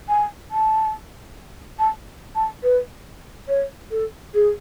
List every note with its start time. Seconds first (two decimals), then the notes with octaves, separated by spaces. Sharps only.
0.09 G#5
0.51 A5
1.79 A5
2.35 A5
2.63 B4
3.48 C#5
3.91 A4
4.34 G#4